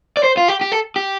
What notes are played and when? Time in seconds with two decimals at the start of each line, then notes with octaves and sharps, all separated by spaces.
0.17 D5
0.24 C5
0.37 F4
0.48 G4
0.61 G4
0.72 A4
0.96 G4